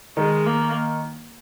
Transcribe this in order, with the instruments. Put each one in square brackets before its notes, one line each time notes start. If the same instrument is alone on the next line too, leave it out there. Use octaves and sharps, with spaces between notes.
[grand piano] D#3 [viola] G#3
[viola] A#3